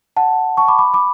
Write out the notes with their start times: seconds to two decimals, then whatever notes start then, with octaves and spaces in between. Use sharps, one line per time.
0.17 F#5 A5
0.57 A5 C#6
0.68 B5 D6
0.79 B5 D6
0.94 B5 D6